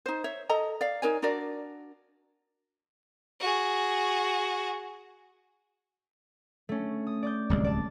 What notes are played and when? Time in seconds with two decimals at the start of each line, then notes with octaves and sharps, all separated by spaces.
0.06 D#4 C5
0.24 C#5 E5
0.50 A4 D#5 A#5
0.81 D5 F5
1.02 D#4 A#4 C#5 G#5
1.22 D4 F#4 A#4 D5
3.40 F#4 G#4
6.69 A3 C#4
7.07 D#6
7.23 D5 D6 G6
7.49 D1 C2 G#3
7.64 D5 A5